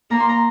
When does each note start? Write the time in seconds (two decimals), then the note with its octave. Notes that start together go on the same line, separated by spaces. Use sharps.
0.10 A#3 A#5
0.20 C6
0.29 A#5